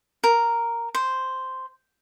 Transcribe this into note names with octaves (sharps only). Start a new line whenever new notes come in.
A#4
C5